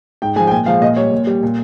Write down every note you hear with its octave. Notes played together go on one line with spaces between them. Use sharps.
G#2 G5
F3 G#3 G#5
G5
A#2 G#5
F3 G#3 F5
A#2 D#5
G3 C#5
A#2
G3
A#2